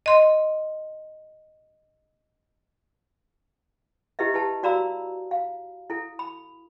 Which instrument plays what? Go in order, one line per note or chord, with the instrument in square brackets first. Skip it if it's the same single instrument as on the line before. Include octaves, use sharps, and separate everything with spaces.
[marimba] D#5 C6
[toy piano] E4 G4 B4 D#5 E5
E4 G4 B4 A5
F#4 D5 F5 A#5 B5 E6
F5
E4 A4
B5